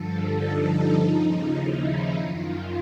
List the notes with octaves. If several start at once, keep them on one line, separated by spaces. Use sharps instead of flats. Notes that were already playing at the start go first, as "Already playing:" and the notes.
Already playing: G2 D3 F3 A4
D#4
D#2 C#3 F3 D#4
E4
F#2 D#3 F4